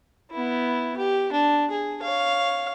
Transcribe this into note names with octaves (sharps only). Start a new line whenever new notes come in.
B3 E4
G4
D4
G#4
C#5 F5